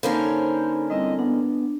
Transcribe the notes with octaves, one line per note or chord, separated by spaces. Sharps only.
D3 A#3 C#4 D#4 A4 C5 B5
G3 C4 E4 D#5
B3 D4